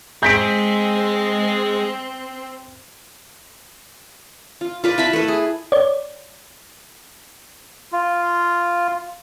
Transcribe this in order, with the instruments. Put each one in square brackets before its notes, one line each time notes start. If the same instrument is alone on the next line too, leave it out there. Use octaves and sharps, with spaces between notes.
[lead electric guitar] G#3 G#4 [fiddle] C4 [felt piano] G6 B6 D7
[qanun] F4
F4 B4 D5
E4 A5 B5
A3 B4
G#4
[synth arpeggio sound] C#5 D5
[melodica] F4